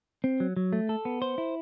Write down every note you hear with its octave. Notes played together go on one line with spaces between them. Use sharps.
C4
F#3
F#3
A3
A4
B3
C5
E4